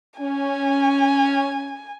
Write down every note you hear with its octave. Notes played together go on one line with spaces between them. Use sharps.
C#4 G#5